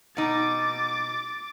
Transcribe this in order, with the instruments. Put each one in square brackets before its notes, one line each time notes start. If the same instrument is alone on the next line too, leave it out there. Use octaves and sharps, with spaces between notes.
[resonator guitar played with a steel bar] B2 D#4 [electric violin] D6 A6